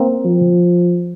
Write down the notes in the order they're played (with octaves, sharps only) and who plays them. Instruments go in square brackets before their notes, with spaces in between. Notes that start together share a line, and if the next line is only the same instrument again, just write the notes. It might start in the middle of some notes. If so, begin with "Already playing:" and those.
Already playing: [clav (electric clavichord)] A#3 C4
[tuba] F3